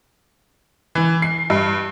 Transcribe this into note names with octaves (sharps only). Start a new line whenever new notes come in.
E3
C7
G2